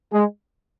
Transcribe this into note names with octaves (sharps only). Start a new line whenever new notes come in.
G#3